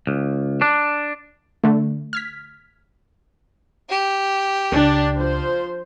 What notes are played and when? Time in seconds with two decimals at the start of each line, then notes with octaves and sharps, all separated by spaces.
0.07 C#2
0.62 D4
1.64 D3 A3
2.13 F6 G#6 B6
3.89 G4
4.72 C#2 D4
5.17 F3 C5